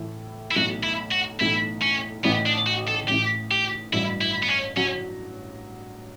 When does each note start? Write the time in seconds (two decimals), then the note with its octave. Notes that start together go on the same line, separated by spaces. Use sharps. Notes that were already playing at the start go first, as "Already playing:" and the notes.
Already playing: A2 E3 A3 E4
0.51 E4
0.56 B1 A2 E3 A3 F#4
0.83 E4
1.12 F#4
1.40 B1 A2 E3 A3 E4
1.82 C#4
2.24 A1 A2 E3 B3
2.46 D4
2.67 F#4
2.88 A4
3.08 A1 A2 E3 G4
3.51 G4
3.93 A1 G2 F#3 E4
4.21 E4
4.43 B3
4.49 C#4
4.77 F#3 C#4